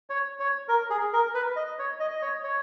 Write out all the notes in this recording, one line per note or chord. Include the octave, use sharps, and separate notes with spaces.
C#5
C#5
A#4
G#4
A#4
B4
D#5
C#5
D#5
D#5
C#5
C#5